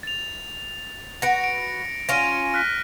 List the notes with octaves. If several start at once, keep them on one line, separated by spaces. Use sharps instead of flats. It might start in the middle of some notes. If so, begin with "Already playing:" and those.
A6 F7
F#4 B4 A#6 C#7 D7
D7
C#4 F4 A#6 D7 D#7
F6 F#6 B6